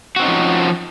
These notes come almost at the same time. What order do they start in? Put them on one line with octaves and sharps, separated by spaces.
F#4 C4 D#4 C#4 F3